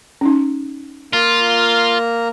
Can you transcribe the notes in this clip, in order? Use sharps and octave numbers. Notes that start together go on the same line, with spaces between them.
C#4 D#4
A#3 F4 A#5